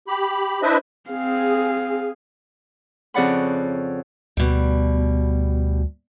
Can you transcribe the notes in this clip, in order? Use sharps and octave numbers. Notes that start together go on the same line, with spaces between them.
G4 B5
D4 E4 B4 C5 D#5 E5
C4 G#4 F5
F2 C#3 D5 F#5 B5
D2 B2 G3